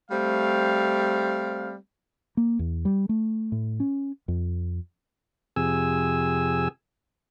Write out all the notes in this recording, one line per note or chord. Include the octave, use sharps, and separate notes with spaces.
G3 A3 C4 F5
A#3
E2
G3
A3
A2
C#4
F2
F2 C3 G#4 G#5 E6